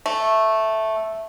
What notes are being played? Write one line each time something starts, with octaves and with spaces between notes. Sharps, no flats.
A3